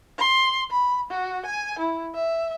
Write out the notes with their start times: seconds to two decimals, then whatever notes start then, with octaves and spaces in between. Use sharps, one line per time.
0.18 C6
0.71 B5
1.11 F#4
1.45 G#5
1.79 E4
2.15 E5